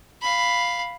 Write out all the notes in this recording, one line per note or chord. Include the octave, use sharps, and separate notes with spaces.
F5 B5